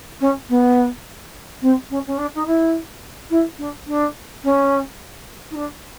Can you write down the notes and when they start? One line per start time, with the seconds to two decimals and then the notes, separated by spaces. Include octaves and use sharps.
0.21 C#4
0.49 B3
1.62 C4
1.90 C#4
2.07 C#4
2.18 D4
2.35 D#4
2.46 E4
3.30 E4
3.59 D4
3.87 D4
4.44 C#4
5.51 D#4
5.55 D4